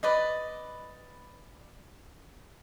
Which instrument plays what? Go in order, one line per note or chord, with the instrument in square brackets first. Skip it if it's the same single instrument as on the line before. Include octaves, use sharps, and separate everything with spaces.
[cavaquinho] B4 D5 D#5